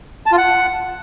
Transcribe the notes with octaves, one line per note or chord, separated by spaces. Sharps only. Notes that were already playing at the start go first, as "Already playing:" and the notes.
A5
F4
F#5